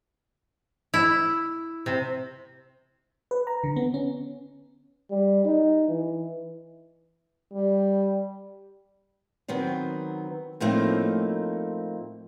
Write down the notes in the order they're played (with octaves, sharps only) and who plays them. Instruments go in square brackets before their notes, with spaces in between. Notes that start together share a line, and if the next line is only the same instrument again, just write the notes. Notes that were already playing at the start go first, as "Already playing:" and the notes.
[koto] E4
C3
[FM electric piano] B4
A#5
D3
B3
C#4
[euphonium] G3
D#4
E3
[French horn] G3
[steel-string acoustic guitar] D#3 F#3 B3 C4
A2 F3 A3 A#3 C4 D#4